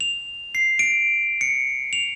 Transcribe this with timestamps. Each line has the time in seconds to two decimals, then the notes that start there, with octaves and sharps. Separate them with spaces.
0.01 F7
0.55 C7
0.79 D7
1.41 C#7
1.93 F7